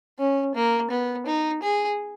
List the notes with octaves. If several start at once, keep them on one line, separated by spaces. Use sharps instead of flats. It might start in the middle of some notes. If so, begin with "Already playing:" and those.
C#4
A#3
B3
D#4
G#4